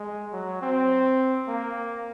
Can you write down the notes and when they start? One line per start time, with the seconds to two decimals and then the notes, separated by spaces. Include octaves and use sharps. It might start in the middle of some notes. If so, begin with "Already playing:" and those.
Already playing: G#3
0.32 F#3
0.62 C4
1.47 A#3